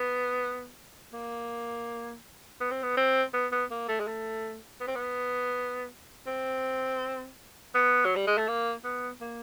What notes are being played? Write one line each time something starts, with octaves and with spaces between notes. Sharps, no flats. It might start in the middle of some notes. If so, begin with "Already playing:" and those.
Already playing: B3
A#3
B3
C4
B3
C4
B3
B3
A#3
A3
G#3
A3
B3
C4
B3
C4
B3
F#3
G3
G#3
A3
A#3
B3
A#3